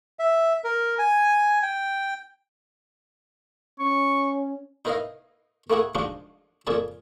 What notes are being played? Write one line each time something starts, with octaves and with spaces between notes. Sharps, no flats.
E5
A#4
G#5
G5
C#4 C#6
D#4 E4 A#4 B4 D#5 F5
A3 A#3 E4 G#4 F#5
F3 G#3 D4 D#4 F4 F#4
F2 A#2 G#4 D5 A5